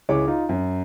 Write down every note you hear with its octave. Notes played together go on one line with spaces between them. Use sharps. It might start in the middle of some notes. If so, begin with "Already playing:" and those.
C#2 E4 G#4 C#5 D6
D#4 F4
F#2